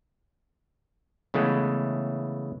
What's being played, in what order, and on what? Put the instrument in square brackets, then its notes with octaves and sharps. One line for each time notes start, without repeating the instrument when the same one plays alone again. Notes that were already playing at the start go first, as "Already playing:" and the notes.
[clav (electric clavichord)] C#3 E3 G#3 A3 B3